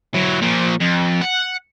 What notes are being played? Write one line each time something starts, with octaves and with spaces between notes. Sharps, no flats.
F#3 E4
A#2 F3
F2
F#5